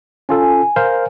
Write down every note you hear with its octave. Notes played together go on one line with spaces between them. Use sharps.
C#4 F4 A4 G#5
A#4 C5 F5 D#6
D5